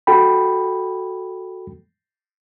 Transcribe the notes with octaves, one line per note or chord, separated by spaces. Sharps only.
F#4 A4 G5 B5